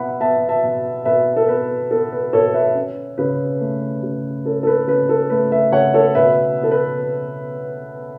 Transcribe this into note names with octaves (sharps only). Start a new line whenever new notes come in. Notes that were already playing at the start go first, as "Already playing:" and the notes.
Already playing: B2 B3 E5 F#5 B5
B3 E5 A5
E5 A5
B2
B2 B4 E5
A4
B3 B4
B3 A4
B4
B2 A4 C#5
B4 E5
C#4
C#3 B4
A3
C#3
C#4 A4
A4
B4
C#3 B4
A4
A3 B4
B4 E5
C#3 C#5 F#5
A4 C#5
B2 B4 E5
B3
A4
B4